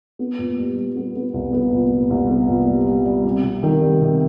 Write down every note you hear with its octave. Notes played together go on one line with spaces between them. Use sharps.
B3
A#2
G3
G3
B3
B3
C2
B3
A#2
A#2
C2
B3
A#2
G3
G3
G3
C3
C3
D#3
G3
C3